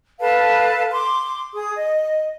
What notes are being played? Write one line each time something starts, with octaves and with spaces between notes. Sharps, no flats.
A4 B4 F5 A5
C6 D6
G#4 D#6
D#5